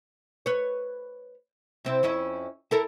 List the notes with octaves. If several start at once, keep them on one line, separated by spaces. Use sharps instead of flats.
B4 C#5
C3 C4 E4
F2 C#4 E4
E4 A4 A#4